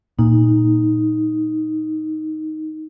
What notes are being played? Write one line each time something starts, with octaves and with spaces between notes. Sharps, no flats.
A#2 D#4